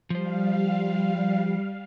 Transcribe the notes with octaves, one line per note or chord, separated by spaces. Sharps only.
F3 G3 C5 F5